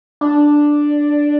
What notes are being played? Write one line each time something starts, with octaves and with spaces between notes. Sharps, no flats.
D4